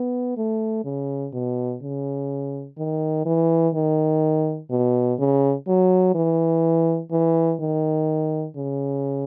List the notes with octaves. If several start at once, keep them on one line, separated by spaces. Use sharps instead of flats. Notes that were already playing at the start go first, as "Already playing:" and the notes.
Already playing: B3
A3
C#3
B2
C#3
D#3
E3
D#3
B2
C#3
F#3
E3
E3
D#3
C#3